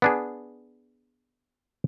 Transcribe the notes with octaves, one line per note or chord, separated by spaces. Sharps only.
B3 D4 G#4